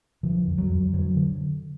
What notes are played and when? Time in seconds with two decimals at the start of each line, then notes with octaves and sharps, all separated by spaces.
0.23 D3 F3
0.47 F2
0.58 F#3
0.71 F2
0.93 D3 F#3
1.17 D3